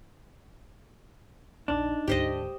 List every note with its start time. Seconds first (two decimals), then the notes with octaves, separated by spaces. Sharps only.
1.68 A#1 E2 D4 D#4
2.08 D2 G#2 G4 C5 D#5